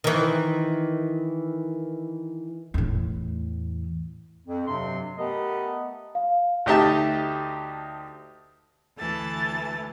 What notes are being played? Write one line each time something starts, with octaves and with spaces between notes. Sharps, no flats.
D#3 E3
E2 A2
F2
G2 C3 F#3 C6
A3 B3 G4 A#4 D#5
F5
D2 D#4 G4 D#5 E5 A5
D2 E3 A5 A6